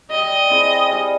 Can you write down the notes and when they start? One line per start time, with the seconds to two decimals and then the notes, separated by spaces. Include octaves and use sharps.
0.10 G3 D#5
0.51 C4 E4 G#4
0.91 G3